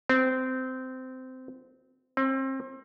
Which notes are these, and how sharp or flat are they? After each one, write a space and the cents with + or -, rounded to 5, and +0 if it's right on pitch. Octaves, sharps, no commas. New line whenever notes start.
C4 -20
C4 +30